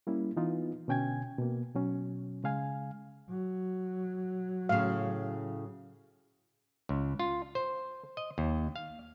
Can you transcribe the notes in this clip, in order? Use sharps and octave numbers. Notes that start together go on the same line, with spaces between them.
G3 A#3 C#4 E4
E3 B3 D#4 F4
B2 D3 C#4 G5 G#5 G#6
B2 A#3
B2 F#3 C#4
C#3 G#3 F5 G#5
F#3
A2 C#3 F5
C#2
F4
C5
D#5
D#2
F5